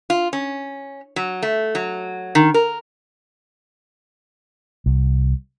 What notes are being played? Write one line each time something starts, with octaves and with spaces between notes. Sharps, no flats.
F4
C#4
F#3
A3
F#3
D#3
A#4
C2